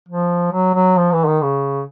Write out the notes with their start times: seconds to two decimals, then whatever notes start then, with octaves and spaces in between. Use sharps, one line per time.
0.09 F3
0.52 F#3
0.75 F#3
0.97 F3
1.12 E3
1.26 D#3
1.42 C#3